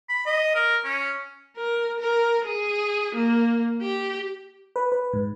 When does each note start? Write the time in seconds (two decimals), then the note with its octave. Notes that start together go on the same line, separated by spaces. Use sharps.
0.09 B5
0.26 D#5
0.55 A#4
0.84 C#4
1.56 A#4
2.00 A#4
2.45 G#4
3.15 A#3
3.81 G4
4.76 B4
4.92 B4
5.13 G#2